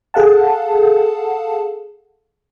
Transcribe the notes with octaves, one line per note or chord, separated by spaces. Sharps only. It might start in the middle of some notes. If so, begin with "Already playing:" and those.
G#4 A4 F5 F#5 A5